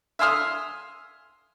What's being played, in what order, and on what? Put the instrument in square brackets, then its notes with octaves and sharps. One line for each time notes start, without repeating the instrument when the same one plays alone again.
[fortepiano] E5 F5 G#5 C6 D#6 F6